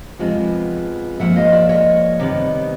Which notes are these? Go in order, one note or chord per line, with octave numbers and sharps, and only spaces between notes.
F2 C3 F3 G#3 B3
G#2 F3 A#3 E5 F#5
D#5 F5
D5 E5
C#5 D#5
C3 D#3 G3 B3